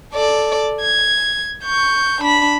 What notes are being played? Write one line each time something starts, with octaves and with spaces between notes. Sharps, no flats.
A4 D5
G#6
C#6 G6
D4 B5